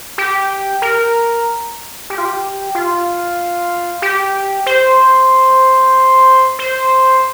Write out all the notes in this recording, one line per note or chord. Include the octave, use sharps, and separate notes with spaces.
G4
A#4
G4
F4
G4
F4
G4
C5
C5